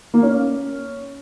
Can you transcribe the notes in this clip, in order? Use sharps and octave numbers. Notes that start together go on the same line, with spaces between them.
A#3
C#4